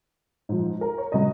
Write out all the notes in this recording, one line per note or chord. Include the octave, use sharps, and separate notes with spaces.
G#2 F3
A#4
C#5
C#3 F#3 D#5